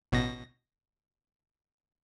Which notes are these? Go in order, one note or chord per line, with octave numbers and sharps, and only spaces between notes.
A1 B2 A#6